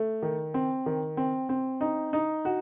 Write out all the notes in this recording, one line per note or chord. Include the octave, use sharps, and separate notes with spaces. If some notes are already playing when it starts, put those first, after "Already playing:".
Already playing: A3
D#3
C4
D#3
C4
C4
D#4
D#4
F#4